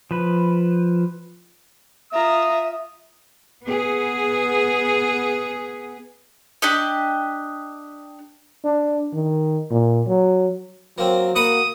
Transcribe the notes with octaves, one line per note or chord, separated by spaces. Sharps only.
F3 B4
F4 E5 A#5 D#6
B3 G#4
D4 G4 D#5
D4
D#3
A#2
F#3
F#3 A#3 C4
A#3 F#4 F#5 B5 D#6